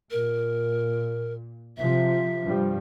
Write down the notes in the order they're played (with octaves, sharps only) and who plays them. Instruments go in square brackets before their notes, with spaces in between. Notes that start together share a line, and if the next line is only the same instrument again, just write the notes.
[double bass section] A#2 [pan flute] A#4
[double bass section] C3 F3 [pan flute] E5
[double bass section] G2 F3 G3